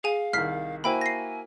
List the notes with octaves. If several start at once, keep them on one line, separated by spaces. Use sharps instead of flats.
G#4 F5 G#5
C2 D#3 F6 B6 C7
A#3 E4 F#4 C5 G5 G#5 B5
A#6 C7